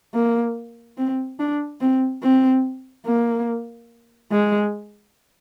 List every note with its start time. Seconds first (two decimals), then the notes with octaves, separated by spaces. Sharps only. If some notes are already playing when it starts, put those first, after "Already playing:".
0.14 A#3
0.97 C4
1.39 D4
1.81 C4
2.23 C4
3.06 A#3
4.31 G#3